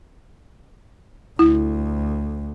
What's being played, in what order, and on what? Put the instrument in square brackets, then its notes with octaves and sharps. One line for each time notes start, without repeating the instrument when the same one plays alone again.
[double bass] D2 [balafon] E4